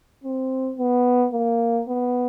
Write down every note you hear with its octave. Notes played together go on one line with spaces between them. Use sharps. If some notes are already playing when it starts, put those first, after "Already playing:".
C4
B3
A#3
B3